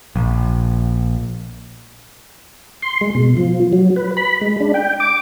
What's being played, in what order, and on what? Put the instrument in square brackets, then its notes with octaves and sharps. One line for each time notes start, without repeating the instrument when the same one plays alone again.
[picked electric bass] A#1
[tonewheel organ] C6
G#3
B2
F3
F#3
B4
B5
G#3
D4
G5
D6